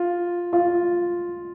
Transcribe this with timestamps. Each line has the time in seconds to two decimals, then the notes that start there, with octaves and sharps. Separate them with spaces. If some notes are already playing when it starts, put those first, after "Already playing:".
Already playing: F4
0.53 F4